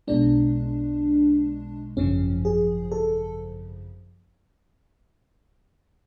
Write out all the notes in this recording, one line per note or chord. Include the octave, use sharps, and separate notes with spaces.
B1 B2 G#3 D4
G#1 F#2 C#3 F3 C#4
G#4
A4